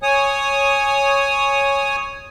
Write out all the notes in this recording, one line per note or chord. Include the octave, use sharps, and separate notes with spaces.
C#5 G#5 D#6